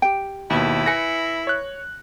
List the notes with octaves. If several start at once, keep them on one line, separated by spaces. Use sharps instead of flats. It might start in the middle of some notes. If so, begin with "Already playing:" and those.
G4 G5
D#2 B2 E4
B4 G#5 A#6 C#7
C#5 F#6